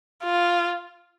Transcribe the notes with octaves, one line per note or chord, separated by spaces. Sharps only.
F4